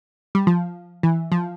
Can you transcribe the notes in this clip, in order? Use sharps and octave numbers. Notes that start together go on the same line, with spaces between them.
G3
F3
E3
F3